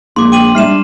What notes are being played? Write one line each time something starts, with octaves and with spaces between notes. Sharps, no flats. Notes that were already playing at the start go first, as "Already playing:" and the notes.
A#1 G#3 A#3 C6 D6
G5 D6 D#7 F#7
G3 D4 E5 F6 C7 E7